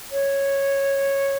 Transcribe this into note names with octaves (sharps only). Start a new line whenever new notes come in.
C#5